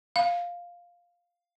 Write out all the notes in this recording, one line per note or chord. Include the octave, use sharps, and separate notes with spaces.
F5